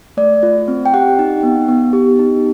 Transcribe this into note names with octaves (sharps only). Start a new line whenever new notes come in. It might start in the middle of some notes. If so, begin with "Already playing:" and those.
A3 D5
F4
C4
G5
G4 F#5
D#4
B3
B3
G4
D#4